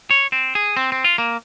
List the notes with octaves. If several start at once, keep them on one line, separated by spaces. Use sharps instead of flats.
C#5
C4
G#4
C4
C4
F4
A#3